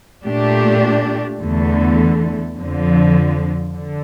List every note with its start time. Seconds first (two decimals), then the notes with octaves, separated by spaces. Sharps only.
0.24 A#2 A3 D4 G4
1.41 E2 D3 A3
2.57 F2 D3 F3
3.73 D3